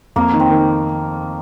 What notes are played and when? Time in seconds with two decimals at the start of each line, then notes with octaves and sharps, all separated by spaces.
0.16 F2 A#3
0.33 D#3
0.40 C4
0.50 D#3